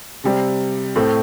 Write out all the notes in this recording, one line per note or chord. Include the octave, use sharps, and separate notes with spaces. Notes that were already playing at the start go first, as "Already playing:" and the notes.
C3 G3 C4
A2 A3 C4